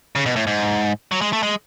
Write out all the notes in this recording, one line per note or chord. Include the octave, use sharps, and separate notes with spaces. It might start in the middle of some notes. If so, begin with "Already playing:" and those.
C#3
B2
A2
G#2
F#3
G#3
A3
G#3